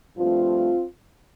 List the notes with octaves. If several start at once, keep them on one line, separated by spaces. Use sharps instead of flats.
G2 F3 A3 C4 F4